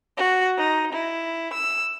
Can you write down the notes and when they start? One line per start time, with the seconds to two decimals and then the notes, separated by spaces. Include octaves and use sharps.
0.16 F#4
0.58 D#4
0.92 E4
1.52 E6